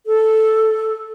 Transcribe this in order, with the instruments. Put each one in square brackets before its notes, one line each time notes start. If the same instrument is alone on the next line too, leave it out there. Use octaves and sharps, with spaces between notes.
[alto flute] A4